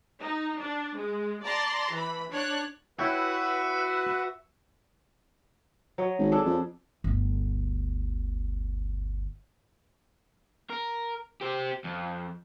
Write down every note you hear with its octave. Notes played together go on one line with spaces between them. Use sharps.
D#4
D4
G#3
D5 A5 A#5 C6
E3 B5
D4 C#5 F#6
E4 F#4 B4 C#5 E5 G5
F#3 C#5 D#5
G#1
D4 G#4 A4
F2
G1 D2
A#4
G4 C5
F2